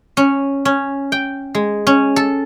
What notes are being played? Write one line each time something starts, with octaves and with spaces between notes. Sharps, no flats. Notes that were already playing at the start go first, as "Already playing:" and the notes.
C#4
C#4
G5
G#3
C#4
A4